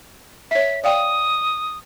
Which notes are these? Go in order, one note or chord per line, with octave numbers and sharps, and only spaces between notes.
C#5 E5 B6
D5 F5 G5 D#6